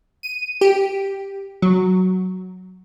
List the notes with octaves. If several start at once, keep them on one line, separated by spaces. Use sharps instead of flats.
D#7
G4
F#3